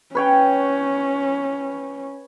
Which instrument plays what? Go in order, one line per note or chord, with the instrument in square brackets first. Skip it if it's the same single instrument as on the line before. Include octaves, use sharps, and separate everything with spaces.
[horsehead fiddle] C#4 [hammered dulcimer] B4 C#5 G5